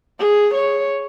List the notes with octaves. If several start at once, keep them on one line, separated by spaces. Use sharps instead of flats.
G#4
C#5